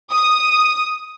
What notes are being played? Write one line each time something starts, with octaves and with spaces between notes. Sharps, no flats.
D#6